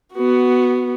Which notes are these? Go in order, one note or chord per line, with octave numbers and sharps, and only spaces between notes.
B3 F#4